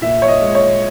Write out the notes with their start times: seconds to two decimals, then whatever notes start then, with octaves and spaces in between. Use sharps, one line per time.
0.02 A#2 E5
0.22 C#5
0.28 D#5
0.42 G#3
0.55 C#5